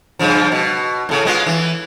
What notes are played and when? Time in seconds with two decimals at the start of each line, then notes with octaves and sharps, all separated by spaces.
0.19 G2 C#3 F3
0.52 B2
1.09 A2 C#3
1.25 G#3 B3 F4
1.46 E3